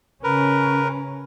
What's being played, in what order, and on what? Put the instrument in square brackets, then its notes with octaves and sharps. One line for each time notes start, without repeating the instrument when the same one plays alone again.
[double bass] C#3 C#4 [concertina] A#4 B4